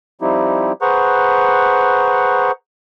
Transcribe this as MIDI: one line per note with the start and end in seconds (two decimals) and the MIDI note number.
0.21 0.72 53
0.21 0.72 55
0.21 0.72 60
0.21 0.72 63
0.21 0.72 64
0.21 0.72 67
0.81 2.51 68
0.81 2.51 71
0.81 2.51 72
0.81 2.51 78
0.81 2.51 82
0.81 2.51 85